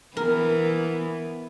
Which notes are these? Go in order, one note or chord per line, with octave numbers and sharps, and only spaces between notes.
E3 B3 A#4